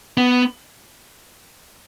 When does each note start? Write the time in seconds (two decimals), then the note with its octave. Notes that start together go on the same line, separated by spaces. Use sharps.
0.17 B3